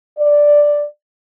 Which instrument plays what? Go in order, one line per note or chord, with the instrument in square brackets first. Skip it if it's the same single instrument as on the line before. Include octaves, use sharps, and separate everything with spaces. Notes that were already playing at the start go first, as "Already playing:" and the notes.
[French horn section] D5